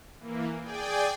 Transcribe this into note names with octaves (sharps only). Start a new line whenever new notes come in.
E3 A#3
G#4 D5 G5 G#5